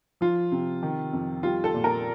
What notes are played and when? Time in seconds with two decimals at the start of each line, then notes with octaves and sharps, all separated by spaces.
0.21 F3 F4
0.52 C3
0.83 D#3
1.13 F2
1.43 G3 F4
1.64 A4
1.74 A#2
1.84 A#4